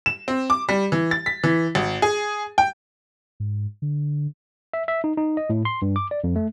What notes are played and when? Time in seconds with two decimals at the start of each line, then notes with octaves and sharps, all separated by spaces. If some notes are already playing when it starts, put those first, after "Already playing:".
0.06 E7
0.28 C4
0.50 D6
0.69 G3
0.92 E3
1.11 A6
1.26 B6
1.44 E3
1.75 G#1
2.02 G#4
2.58 G5
3.40 G#2
3.82 D3
4.74 E5
4.88 E5
5.04 D#4
5.18 D#4
5.37 D#5
5.50 A2
5.65 C6
5.82 G2
5.96 D6
6.11 D5
6.24 F2
6.36 A3